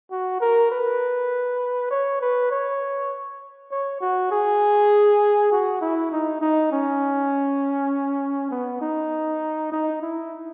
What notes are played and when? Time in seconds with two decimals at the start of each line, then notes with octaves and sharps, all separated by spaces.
0.11 F#4
0.41 A#4
0.72 B4
1.91 C#5
2.21 B4
2.51 C#5
3.71 C#5
4.01 F#4
4.31 G#4
5.52 F#4
5.81 E4
6.12 D#4
6.41 D#4
6.72 C#4
8.51 B3
8.81 D#4
9.72 D#4
10.02 E4